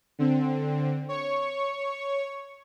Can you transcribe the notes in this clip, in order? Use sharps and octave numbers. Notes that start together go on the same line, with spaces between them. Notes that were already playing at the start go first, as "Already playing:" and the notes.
D3 C4
C#5 C#6